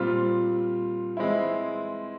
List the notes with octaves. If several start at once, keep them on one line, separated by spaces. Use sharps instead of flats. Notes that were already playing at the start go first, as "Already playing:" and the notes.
Already playing: A#2 G3 C4 F4
E3 G#3 C4 E4